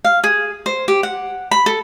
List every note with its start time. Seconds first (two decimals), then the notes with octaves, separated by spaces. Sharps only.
0.05 F5
0.24 G#4
0.66 C5
0.88 G4
1.03 F#5
1.51 B5
1.66 A4